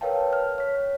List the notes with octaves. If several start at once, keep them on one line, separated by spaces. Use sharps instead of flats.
A#4 B4 C#5 F5 G5 A5
F6
C#5 B6